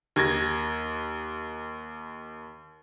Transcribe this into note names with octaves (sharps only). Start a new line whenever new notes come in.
D#2 G#6 A#6